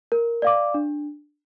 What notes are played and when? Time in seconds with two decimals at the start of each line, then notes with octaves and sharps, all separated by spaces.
0.12 A#4
0.42 D5 F5 D6
0.74 D4